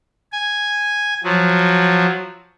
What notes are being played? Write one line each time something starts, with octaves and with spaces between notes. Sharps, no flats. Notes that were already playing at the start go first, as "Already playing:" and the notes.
G#5
F3 F#3